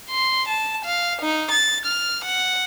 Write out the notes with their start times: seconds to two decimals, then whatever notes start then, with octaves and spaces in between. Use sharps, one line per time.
0.10 C6
0.48 A5
0.85 F5
1.22 D#4
1.51 A6
1.86 F6
2.25 F#5